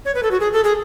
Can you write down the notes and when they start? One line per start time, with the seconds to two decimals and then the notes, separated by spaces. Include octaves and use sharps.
0.05 C#5
0.15 B4
0.23 A4
0.31 F#4
0.40 G#4
0.53 A4
0.64 G#4